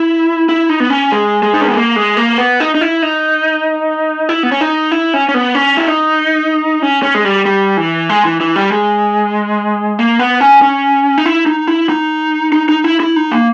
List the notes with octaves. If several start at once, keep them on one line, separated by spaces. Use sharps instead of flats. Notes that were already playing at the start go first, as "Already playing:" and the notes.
Already playing: E4
E4
D#4
B3
C#4
G#3
G#3
D#4
C#4
B3
A#3
G#3
A#3
B3
D#4
D#4
E4
D#4
E4
B3
C#4
D#4
E4
C#4
C#4
B3
C#4
E4
D#4
C#4
C#4
G#3
G3
G3
E3
G#3
E3
E3
G3
G#3
A#3
B3
C#4
C#4
D#4
E4
D#4
E4
D#4
D#4
D#4
E4
E4
D#4
A#3